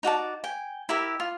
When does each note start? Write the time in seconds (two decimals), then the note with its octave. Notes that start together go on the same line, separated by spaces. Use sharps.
0.03 D#4 F#4 D5 A5
0.44 G5 G#5
0.89 E4 G4 A#4 E5
1.20 F4